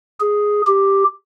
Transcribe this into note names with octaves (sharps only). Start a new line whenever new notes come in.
G#4
G4